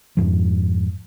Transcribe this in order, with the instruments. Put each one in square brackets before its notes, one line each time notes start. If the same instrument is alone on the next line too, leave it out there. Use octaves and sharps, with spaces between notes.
[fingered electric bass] F2 G#2 F3